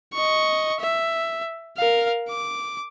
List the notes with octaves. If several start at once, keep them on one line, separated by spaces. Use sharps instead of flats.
D#5 C#6
E5
A#4 F5
D6